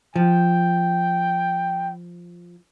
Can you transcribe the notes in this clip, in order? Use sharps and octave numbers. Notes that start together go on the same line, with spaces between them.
F3 G5